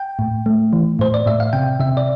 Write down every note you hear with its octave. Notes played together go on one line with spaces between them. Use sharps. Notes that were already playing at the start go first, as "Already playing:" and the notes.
Already playing: G5
A2
A3
E3
A2 C5
D5
A2 E5
F5
C3 G5
C3 E5
D5